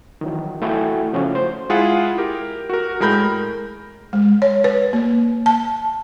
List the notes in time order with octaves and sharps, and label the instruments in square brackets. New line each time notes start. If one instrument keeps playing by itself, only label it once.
[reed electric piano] D#3 E3 F#3
A3 E4 F#4 A4 G5 G#5
C#3 F3 A3 C#4 F#4
C5
[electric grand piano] G#3 E4 F4 G#4 F#5
G4 A#4
F#4 A#4
A2 G#3 A#4 B5 G6
[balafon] G#3
C#5
B4
A#3
A5